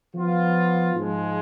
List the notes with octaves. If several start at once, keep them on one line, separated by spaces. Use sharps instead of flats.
F3 B3 F4
G#2 F3 G#3